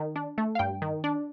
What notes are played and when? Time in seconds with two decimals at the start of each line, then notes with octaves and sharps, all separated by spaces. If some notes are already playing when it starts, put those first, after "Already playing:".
Already playing: D#3
0.16 D4
0.38 A3
0.55 F5
0.59 G2 G5
0.82 D#3
1.04 D4